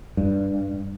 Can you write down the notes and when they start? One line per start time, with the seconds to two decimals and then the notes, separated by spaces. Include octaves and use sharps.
0.17 G2